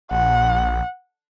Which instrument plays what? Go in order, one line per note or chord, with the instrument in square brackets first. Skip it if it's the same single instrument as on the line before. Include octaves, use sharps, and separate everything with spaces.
[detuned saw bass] A#1 [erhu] F#5